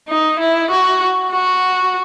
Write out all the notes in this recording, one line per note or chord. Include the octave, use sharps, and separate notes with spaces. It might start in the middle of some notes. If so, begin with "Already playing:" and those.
D#4
E4
F#4
F#4